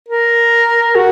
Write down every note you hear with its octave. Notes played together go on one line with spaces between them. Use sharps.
A#4
F#4